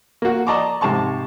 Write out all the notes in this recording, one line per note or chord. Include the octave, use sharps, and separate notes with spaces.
A#3 F#4
D5 D#5 A5 A#5 C#6 D6
G#2 C3 A5 C#6